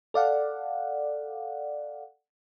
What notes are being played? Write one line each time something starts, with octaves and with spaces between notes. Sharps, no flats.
A4 D5 F5 F#5